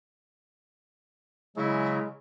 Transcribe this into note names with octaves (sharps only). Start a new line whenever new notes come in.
C#3 F#3 G#3 E4